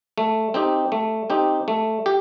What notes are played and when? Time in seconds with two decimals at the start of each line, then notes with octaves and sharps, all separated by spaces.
0.18 A3
0.54 C4 D#4 G4
0.92 A3
1.30 C4 D#4 G4
1.68 A3
2.06 G4